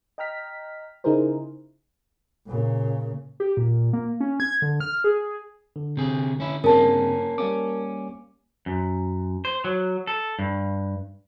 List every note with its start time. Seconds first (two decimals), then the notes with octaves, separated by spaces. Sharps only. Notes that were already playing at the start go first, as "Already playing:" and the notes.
0.18 D#5 G5 A#5 F6 B6
1.04 C#3 D#4 E4 G#4 A#4 C5
2.48 A#2 C#3
3.40 G4
3.57 A#2
3.93 A#3
4.20 C#4
4.40 G#6
4.62 D3
4.80 F6
5.04 G#4
5.76 D3
5.97 C3 G#4
6.40 C#4 E4
6.64 G2 C#3 A#3 C4 C#4 A#4 A5
7.38 G3 A#3 C#4 D6
8.66 F#2
9.45 C5
9.64 F#3
10.07 A4
10.39 G2